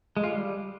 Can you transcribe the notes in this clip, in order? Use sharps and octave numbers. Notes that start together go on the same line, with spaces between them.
G#3
F4
G3